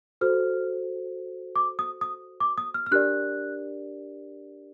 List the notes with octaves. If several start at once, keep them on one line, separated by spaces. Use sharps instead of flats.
F#4 A4 C5 F6
D6
D#6
D#6
D6
D#6
F6
F6
D4 G4 A#4 D5 F#6